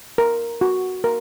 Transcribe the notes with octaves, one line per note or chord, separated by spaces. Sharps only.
A#4
F#4
A#4